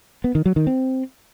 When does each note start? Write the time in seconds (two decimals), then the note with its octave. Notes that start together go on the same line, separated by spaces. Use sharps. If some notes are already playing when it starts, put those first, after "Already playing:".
0.24 B3
0.35 D#3
0.46 F#3
0.56 D#3
0.67 C4